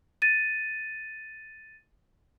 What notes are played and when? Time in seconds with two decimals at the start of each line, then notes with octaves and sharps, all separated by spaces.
0.22 A6 D#7